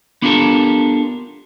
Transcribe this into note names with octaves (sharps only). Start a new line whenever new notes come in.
B3 D4 F4 G4 A4 A#4